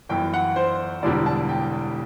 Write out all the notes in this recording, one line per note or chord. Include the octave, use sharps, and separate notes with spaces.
G1 F#2 E3 G5
F#5
C5
E1 E2 D3 G3 D5
A5
G5